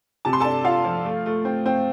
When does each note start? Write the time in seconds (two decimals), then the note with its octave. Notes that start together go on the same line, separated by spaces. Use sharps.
0.25 C3 A5
0.33 C6
0.40 D4 A4 A5
0.65 F4 F5
0.85 F3
1.05 A3
1.26 A3
1.45 C4
1.66 C4